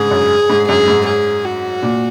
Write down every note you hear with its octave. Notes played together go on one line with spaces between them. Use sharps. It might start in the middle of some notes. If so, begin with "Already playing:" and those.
Already playing: G#2 C#3 G#4
F#2
G#2
F#2 G#4
G#2
G#4
F#4
A#2